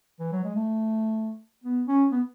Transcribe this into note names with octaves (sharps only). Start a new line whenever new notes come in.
E3
F#3
G#3
A3
B3
C#4
B3